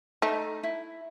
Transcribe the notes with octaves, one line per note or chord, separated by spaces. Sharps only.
A3 D#4
E4